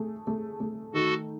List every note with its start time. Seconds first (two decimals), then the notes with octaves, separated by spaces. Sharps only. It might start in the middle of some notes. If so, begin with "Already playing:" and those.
Already playing: A3 G#4
0.27 A3
0.60 A3
0.94 D#3 F#4 A4